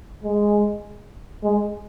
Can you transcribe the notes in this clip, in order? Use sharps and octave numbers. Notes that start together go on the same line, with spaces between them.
G#3
G#3